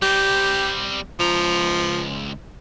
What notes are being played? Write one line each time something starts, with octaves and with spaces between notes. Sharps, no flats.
G3 C4 G4
C#2 F3 A#5